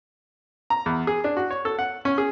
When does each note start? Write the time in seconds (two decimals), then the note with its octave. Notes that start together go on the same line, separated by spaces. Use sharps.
0.70 A#5
0.86 E2
1.07 G#4
1.24 D4
1.37 F#4
1.51 C#5
1.65 A4
1.79 F#5
2.05 C#4
2.18 G#4